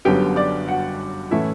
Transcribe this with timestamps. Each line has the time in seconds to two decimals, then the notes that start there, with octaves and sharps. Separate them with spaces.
0.05 G1 F#2 D3 F#3 B3 G4 G5
0.36 D5 D6
0.68 F#4 F#5
1.31 A2 E3 A3 C#4 E4 E5